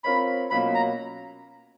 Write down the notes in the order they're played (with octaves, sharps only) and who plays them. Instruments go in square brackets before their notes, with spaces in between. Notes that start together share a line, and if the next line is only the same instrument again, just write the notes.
[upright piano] C4 F4 A#4 C#5 [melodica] B5
[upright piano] B2 F#3 A#3 C#4 F4 [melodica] B5
[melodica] A#5